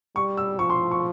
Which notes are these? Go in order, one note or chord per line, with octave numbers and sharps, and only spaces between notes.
G3 C#6
E6
F3 C#6
C6
C#6